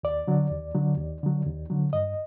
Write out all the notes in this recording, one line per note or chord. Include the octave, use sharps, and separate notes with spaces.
D#2 D5
D3 F#3
D#2
D3 F#3
D#2
D3 F#3
D#2
D3 F#3
G2 D#5